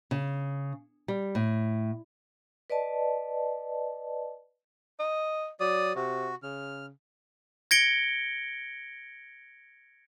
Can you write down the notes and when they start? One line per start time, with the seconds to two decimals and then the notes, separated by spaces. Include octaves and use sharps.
0.11 C#3
1.08 G3
1.35 A2
2.70 B4 D5 D#5 A5
5.00 D#5
5.60 F#3 D5 D#6
5.95 C3 F#4
6.43 C#3 F6
7.71 G#6 A#6 C#7 D7 G7